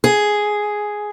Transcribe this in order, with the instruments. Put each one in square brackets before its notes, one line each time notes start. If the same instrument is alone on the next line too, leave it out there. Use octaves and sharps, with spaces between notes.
[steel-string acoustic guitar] G#4